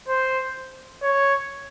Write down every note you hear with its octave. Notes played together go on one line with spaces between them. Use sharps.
C5
C#5